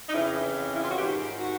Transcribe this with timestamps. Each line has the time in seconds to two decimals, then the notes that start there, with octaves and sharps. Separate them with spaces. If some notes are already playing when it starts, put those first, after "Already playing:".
0.09 D#4
0.12 F2 C#3 E3 E4
0.74 E4
0.82 F4
0.89 F#4
0.96 G#2 D#3 G4
1.39 F#4